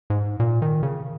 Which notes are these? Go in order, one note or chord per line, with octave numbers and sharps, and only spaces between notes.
G#2
A#2
D#3
C#3